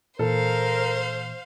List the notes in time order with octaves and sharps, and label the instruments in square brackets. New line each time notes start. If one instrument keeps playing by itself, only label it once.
[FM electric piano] A#2 E3 [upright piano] A4 [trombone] A#4 [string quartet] C5 F5